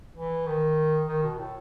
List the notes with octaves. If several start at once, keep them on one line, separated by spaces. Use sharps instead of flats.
E3
D#3
D#3
B2
A2